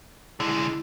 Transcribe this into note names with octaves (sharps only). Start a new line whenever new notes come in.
D3 G#3 E4